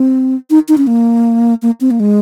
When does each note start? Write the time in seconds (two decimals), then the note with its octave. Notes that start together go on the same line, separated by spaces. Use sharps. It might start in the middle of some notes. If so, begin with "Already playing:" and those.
Already playing: C4
0.50 D#4
0.69 D#4
0.78 C#4
0.87 A#3
1.62 A#3
1.81 C4
1.91 A#3
2.00 G#3